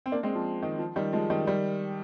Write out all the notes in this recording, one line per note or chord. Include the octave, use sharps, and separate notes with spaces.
C4
A#3 D4
G#3 C4
F3
D#3
F3
D#3 G3
F3 G#3
D#3 G3
D#3 G3